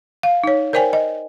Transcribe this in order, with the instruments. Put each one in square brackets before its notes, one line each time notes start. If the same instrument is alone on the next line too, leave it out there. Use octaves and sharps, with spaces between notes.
[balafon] F5
D#4 C#5
A#4 C5 D5 G5 G#5
D#5